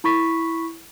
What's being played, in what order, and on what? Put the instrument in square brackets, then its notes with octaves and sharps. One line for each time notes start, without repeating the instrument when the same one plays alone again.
[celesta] E4 B5 C#6 B6